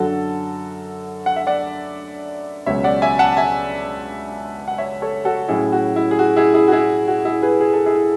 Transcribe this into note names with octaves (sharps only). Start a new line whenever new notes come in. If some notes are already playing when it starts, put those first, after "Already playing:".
Already playing: F#2 D3 F#3 F#4 A4
F#5
E5
D5 F#5
C#2 B2 F#3 C#4 C#5 E5
D5 F#5
E5 G#5
F#5 A5
E5 G#5
F#5
C#5 E5
A4 C#5
F#4 A4
A2 F#3 C#4 E4 G#4
F#4
E4
G#4
F#4
E4 G#4
E4 G#4
F#4
E4 G#4
F#4
E4 G#4
G#4 B4
G#4
A4
E4 G#4